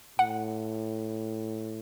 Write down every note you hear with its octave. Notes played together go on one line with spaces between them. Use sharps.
A2 F#5